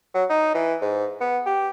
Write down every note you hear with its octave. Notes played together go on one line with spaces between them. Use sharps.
F#3
D#4
E3
G#2
B3
G4